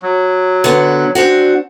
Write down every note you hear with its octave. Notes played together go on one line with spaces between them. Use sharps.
F#3
D3 B3
C4 D4 F#4